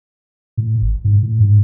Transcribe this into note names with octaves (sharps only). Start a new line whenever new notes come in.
A2
G#1
G#2
A2
G#2